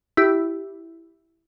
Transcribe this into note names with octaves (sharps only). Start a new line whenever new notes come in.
E4 G4